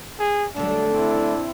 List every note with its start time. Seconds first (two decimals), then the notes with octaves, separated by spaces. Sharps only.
0.20 G#4
0.56 D3 F#3 G3 A3 D4
0.89 C4 E4